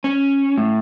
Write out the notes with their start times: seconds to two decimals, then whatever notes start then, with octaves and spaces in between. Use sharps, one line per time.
0.04 C#4
0.58 A2